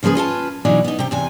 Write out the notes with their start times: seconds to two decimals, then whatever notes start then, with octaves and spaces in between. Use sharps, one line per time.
0.03 C#3 F3 A#3 G#4 B4
0.15 C#4 F4 B4 A5
0.65 B2 E3 F#3 D4 D#4
0.84 B3 D#4
0.99 C3 G4
1.11 E2 C3 G#5